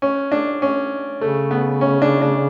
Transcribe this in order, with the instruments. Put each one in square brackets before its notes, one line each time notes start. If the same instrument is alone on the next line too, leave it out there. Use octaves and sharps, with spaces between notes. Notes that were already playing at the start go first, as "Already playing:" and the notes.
[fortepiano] C#4
D4
C#4
[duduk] C#3 [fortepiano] A3
[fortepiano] B3
C#4
D4
D4